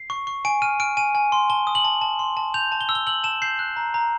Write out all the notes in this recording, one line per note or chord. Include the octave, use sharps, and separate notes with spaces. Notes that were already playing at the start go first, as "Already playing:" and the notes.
Already playing: C7
C#6
C#6
G#5 D7
F6 D#7
F6 D7
G#5 D#7
G#5
C6
A5 G7
D#6
F#7
A5
A5
C6
A5
G6 F7
A5
G7
E6
G7
E6 F#7
A5 E7
G6 C7
F#6
A#5
A#5